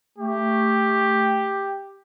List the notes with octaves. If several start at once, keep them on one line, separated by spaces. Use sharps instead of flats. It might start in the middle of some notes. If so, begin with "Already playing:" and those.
A3 G4